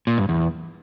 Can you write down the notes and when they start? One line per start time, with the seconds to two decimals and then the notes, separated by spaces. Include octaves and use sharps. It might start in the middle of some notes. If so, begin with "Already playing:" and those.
0.07 A#2
0.18 G2
0.29 E2